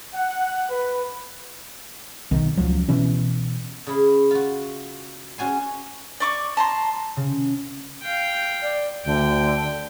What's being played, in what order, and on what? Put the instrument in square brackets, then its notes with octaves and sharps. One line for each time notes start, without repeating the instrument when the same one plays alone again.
[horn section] F#5
B4
[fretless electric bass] B1 D#3
C#2 F3 F#3
B2 E3 C#4
[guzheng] C#3 E4
F4 F#4
C#4 F#4 G#5 C6
[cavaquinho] D5 C#6 D6
A5 A#5 C6
[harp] C#3
[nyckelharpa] F5 G5
[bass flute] D5
[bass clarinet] D2 [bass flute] D3 [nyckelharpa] G5